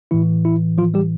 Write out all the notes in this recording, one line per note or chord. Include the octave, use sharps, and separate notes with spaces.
A2 E3 E4
E4
F3 F4
G3 G4